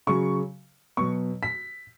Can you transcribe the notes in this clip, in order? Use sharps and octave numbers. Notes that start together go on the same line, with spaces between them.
C#3 F#3 C#6
B2 F#3 C#6
B6